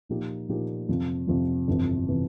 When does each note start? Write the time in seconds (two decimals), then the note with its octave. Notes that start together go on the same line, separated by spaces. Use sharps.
0.09 A#2 F3 A#3 D#4 G4
0.49 A#2 F3 A#3 D#4 G4
0.89 F2 C3 F3
1.27 F2 C3 F3
1.68 G1 F2 C3 E3
2.09 C3 E3